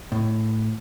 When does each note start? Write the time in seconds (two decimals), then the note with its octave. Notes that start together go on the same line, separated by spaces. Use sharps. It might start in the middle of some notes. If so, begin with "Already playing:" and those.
0.12 A2